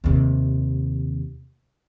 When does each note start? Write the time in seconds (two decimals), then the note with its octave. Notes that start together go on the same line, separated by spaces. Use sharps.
0.04 D#2 C3